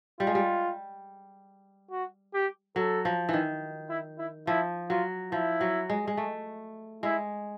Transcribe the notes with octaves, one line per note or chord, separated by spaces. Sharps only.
G3 F4
G#3
G3
F#4
G4
F#3 A4
F3
D#3 E3
E4
E4
F3 E4
F#3 F4
F3 E4
F#3
G#3
G#3
A3
G#3 E4